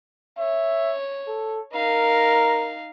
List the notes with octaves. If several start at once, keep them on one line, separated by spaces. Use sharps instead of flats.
C#5 E5
A4
D#4 A#4 F5